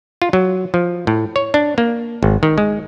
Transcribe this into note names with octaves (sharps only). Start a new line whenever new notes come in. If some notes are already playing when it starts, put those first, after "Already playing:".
F4
F#3
F3
A2
C#5
D4
A#3
G#1
D#3
G#3